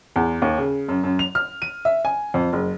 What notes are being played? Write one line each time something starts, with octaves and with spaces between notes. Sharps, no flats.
E2
D#2
C#3
F#2
F#2
F7
F6
D#7
E5
G#5
F2
F#1